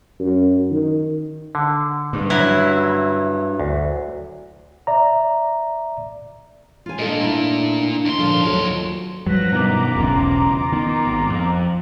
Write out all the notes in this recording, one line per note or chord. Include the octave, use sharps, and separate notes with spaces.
F#2
D#3
D3
G2
F#3 E4
D2
D5 E5 A#5
E3 F4 G#5
A#2 D4 A4 D#5
A3 D#4 E4
D#2 C6
A#2 D3 F3
D2 F#3 F4 A4
G2 F3 F#3 B4 A#6
B2 D#3 A#5 D6
E1 B1 E2 C#3 F4
D#3 B3
G#1
F2